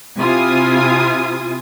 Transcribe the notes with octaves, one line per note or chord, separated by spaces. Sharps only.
C3 E4 F4 G#5 D#6